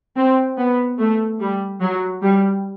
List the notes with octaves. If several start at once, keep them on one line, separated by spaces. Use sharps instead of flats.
C4
B3
A3
G3
F#3
G3